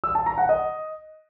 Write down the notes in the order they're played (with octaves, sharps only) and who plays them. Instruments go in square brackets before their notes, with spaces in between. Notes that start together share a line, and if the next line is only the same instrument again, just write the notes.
[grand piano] E6
A5
A#5
F#5
D#5